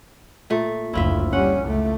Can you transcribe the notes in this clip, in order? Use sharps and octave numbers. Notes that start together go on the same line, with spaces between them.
A#2 A3
F#1 D2 E4 F4 E5
G3 C#4 F#5
C#2 A3